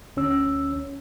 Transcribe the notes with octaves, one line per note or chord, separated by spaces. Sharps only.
D2 C#4 E6